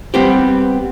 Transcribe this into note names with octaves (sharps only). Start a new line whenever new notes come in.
G3 B3 C4 G4